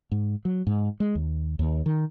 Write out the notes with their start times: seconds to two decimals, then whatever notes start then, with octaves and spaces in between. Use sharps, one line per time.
0.12 G#2
0.45 F#3
0.67 G#2
1.00 G#3
1.15 D#2
1.59 D#2
1.86 D#3